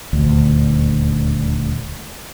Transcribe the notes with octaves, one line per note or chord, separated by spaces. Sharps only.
D#1 D2